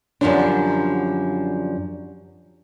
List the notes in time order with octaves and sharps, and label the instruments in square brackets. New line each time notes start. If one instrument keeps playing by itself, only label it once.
[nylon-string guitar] F#2 D3 F3 G3 C4 D4